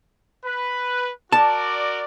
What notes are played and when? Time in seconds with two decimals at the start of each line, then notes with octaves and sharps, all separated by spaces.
0.45 B4
1.32 F#4 A#4 D5 A5